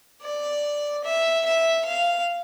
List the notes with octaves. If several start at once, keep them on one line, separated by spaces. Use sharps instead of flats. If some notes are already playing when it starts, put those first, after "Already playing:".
D5
E5
E5
F5